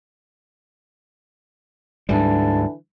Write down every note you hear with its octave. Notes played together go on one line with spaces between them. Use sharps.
D2 G#2 D3 E3 G3 D4